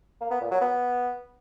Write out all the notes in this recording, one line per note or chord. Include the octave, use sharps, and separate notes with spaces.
A#3
B3
A#2
F#3
B3